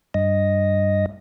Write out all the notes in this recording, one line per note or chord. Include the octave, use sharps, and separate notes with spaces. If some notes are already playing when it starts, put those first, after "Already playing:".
G2 D#5